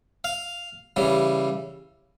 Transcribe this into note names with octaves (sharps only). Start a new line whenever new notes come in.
F5
C#3 E3 G3